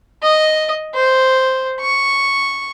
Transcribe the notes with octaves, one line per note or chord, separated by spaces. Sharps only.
D#5
C5
C#6